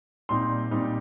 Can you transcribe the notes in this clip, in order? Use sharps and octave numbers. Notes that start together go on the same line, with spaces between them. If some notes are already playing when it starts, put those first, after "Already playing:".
A#2 G3 C4 D#4 C6
A#2 G3 C4 D#4